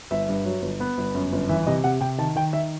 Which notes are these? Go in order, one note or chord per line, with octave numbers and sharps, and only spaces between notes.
G1 E5
G2
F#3
G1
B3
G1
F#2
G1
E3 E5
C3 D#5
C3 F#5
C3 G5
D#3 A5
D#3 G5
D#3 E5